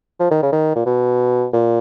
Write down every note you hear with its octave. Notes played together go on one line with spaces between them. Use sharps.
F3
D#3
C#3
D#3
A#2
B2
A#2